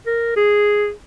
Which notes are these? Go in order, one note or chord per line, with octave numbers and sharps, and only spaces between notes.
A#4
G#4